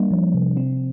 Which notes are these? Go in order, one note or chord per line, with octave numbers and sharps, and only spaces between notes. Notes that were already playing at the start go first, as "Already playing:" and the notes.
Already playing: G3 A#3 D4
F3
C3
C4